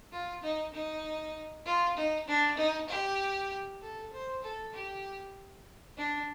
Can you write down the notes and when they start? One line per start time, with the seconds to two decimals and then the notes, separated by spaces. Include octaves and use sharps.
0.12 F4
0.43 D#4
0.74 D#4
1.66 F4
1.97 D#4
2.28 D4
2.58 D#4
2.89 G4
3.81 A4
4.13 C5
4.43 A4
4.74 G4
5.97 D4